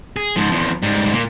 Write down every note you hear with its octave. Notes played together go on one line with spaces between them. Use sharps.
G#4
G#2 F3
E2 F3
G#2 G3
A#2 A#3